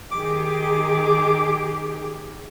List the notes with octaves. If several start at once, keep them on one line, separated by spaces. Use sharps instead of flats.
D#3 G4 G#4 D6